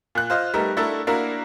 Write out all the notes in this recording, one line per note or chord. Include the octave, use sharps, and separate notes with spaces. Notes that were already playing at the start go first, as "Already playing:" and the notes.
A#2 F#6
F4 C5 D#5 F5
G3 A3 B3 D#4 A#4
A3 D4 E4 F#4 A4 A#4
A#3 D4 E4 F#4 A#4